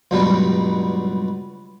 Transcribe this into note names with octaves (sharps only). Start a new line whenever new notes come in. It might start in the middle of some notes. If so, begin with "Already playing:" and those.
C#2 G2 B2 F#3 G3 B3